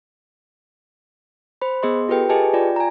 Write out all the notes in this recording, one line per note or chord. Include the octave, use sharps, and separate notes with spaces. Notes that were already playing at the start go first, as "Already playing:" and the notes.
C5 B5
B3 G#4 D#5 C6
F4 G4 A4 B4 G5
G4 G#4 B4 D#5 G#5 A5
F4 D5 G5
G#5 A#5